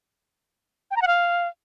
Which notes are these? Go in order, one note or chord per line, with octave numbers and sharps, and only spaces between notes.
G5
A#5
F#5
F5